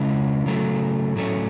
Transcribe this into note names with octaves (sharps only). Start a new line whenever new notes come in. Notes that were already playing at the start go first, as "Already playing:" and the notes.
Already playing: C#3 G#3 C#4 E4
C#3 F#3 A3
A2 F#3 A3 C#4